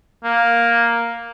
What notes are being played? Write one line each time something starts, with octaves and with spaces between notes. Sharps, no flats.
A#3